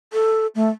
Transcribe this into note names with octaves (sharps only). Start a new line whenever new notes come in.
A4
A3